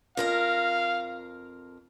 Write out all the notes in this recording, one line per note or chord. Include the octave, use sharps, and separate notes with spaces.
F2 A#4 F5 A#5